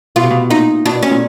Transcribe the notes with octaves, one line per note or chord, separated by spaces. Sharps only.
B2 F4
C3
B2
A#2 D#4
B2 D4
C#4
A#2